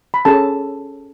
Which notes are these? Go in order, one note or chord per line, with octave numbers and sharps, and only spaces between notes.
B5
C#4 G#4 A4 C#5 A5